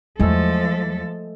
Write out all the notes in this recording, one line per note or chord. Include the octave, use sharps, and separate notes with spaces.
E2 F3 F#3 G#3 A3 A4